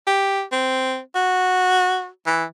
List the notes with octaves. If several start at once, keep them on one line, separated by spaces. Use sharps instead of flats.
G4
C4
F#4
E3